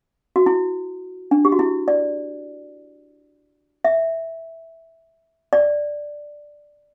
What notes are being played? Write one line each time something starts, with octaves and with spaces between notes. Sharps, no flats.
F#4
E4
D4
G4
F#4
E4
D5
E5
D5